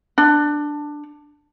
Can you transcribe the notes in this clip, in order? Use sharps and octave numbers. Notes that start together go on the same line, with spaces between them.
D4